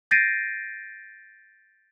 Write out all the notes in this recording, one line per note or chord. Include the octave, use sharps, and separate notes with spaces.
G6 A6 A#6 C7 D7 D#7